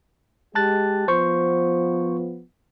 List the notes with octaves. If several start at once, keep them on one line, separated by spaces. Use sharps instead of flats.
G#3 G4 A5 F#6 A6
F3 B3 C5 C#6